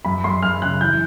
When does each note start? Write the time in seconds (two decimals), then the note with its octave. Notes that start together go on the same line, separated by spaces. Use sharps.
0.05 F#2 B5
0.24 F#2 C6
0.43 F#2 F6
0.62 C#3 F#6
0.81 E3 G6